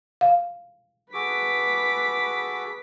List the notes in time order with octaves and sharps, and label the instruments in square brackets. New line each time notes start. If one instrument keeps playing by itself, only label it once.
[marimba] F5
[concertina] F#4 G#4 A4 [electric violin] B4 B6 [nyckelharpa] D6